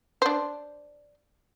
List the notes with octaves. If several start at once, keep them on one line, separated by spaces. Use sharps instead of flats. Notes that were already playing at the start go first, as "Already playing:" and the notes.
D4 C5